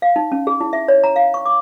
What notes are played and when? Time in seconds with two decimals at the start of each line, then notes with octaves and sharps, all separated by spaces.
0.02 F5
0.16 D#4
0.32 C#4
0.47 G#4
0.61 E4
0.73 E5
0.88 C#5
1.04 A#5
1.16 F5
1.34 C#6
1.46 D6